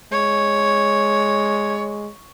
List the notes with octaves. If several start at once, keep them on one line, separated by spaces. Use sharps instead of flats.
G#3 C#5